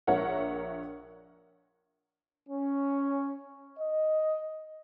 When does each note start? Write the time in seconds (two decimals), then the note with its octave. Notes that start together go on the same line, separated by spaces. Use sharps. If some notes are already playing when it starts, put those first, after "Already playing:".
0.07 A#1 A#4 C#5 E5 F#5
2.49 C#4
3.78 D#5